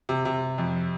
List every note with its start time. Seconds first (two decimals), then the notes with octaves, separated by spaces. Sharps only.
0.09 C3
0.25 C3
0.58 F2